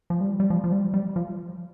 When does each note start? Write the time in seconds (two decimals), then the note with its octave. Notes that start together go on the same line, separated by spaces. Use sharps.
0.10 F3
0.21 G3
0.40 G3
0.50 F3
0.64 F3
0.72 G3
0.94 G3
1.16 F3